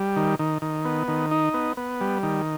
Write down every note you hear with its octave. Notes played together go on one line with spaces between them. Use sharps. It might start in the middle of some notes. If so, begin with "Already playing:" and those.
Already playing: G3
D#3
D#3
D#3
B3
D#3
D#4
B3
B3
G3
D#3